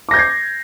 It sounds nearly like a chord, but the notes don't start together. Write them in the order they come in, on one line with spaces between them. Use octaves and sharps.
D6 A#6 G6 G#6 C7